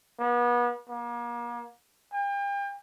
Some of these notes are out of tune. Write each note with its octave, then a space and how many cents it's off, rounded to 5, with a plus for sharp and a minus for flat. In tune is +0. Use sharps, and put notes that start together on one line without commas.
B3 -35
A#3 +40
G5 +40